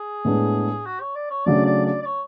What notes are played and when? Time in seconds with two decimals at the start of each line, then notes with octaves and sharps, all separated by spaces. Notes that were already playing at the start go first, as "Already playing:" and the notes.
Already playing: G#4
0.25 A2 G#3 B3 D4
0.86 F#4
1.01 C#5
1.15 D5
1.31 C#5
1.46 C#3 F#3 A3 D4 D5
1.66 D5
1.86 D5
2.02 D5
2.06 C#5